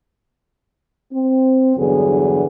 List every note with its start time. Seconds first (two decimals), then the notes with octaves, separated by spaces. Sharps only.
1.13 C4
1.77 E2 G2 D3 F#3 B3 G#4